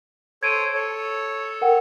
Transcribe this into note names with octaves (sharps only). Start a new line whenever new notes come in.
A4 C5 C#5 G#6 D7 D#7
A4 C#5
A#4 F#5 G5